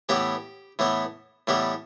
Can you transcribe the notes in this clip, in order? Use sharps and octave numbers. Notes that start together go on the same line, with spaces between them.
A2 E3 B3 G4
A2 E3 B3
A2 E3 G3 B3